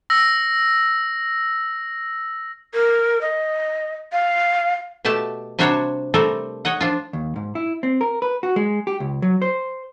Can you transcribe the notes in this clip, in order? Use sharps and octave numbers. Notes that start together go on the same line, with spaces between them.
E6 A#6
A#4
D#5
F5
B2 A3 G4 A5
C3 G3 D4 F#4 C5 C#5
G3 A3 C4 A4 A#4
C#5 D#5 F#5
F3 D4 F4
D#2
G#2
E4
C4
A#4
B4
F#4
G#3
G4
C#2
F#3
C5